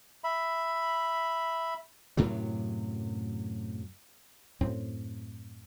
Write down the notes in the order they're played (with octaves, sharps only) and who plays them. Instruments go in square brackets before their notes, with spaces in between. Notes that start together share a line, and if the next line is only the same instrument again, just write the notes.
[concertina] E5 B5
[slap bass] F#2 A2 C3 F#3
[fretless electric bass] F#2 A2 F#3 C4